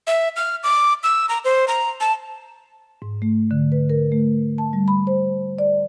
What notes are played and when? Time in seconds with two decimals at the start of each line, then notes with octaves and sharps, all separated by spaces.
0.07 E5
0.36 F6
0.63 D6
1.03 E6
1.29 A#5
1.45 C5
1.68 A#5
2.01 A5
3.02 G#2
3.22 A3
3.51 D3
3.72 B4
3.90 A#4
4.12 A3
4.58 A5
4.73 G3
4.88 B5
5.07 C5
5.59 D5